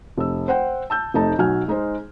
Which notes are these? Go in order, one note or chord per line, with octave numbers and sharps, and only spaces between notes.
F1 E6
C5 F#5 G5
A5 E6 G6
F1 A3 D#4 A5
B1 F#3 G#5 F6
G#3 D#4 G#4 C5